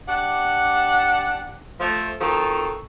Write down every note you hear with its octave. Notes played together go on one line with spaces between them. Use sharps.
D4 G4 F#5
F3 A3
D#3 F3 C4 F#4 A4